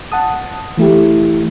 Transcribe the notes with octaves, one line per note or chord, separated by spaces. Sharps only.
F#5 A5 D#6
E3 A3 E4 G4